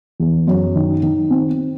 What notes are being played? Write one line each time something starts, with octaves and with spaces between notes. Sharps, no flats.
E2
F#2
D#3
D#3
C4